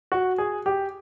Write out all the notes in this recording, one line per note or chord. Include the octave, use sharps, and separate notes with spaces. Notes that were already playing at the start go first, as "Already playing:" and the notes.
F#4
G#4
G4